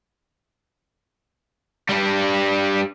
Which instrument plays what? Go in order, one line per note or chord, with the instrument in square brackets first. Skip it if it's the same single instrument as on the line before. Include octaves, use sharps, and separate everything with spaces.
[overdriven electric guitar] G2 G3